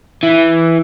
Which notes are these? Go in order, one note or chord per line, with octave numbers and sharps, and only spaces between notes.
E3